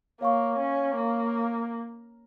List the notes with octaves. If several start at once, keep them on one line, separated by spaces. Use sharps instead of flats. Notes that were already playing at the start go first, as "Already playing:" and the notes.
A#3 C#5 F5 C#6
C#4
A#3